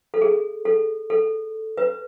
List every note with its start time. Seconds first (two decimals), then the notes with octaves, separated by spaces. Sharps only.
0.14 A4
0.22 G#4
0.65 A4
1.10 A4
1.77 B4